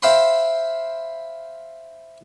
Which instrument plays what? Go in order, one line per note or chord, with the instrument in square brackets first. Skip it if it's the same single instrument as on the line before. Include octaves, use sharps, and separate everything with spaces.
[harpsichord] C5 E5 F5 G5 B5 C6